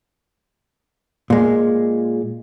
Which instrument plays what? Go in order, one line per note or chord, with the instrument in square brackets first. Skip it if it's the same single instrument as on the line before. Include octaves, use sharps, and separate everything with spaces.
[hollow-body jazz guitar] A#2 G#3